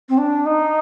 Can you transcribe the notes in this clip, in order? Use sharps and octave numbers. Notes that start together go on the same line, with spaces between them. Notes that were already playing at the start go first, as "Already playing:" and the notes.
C4
D4
D#4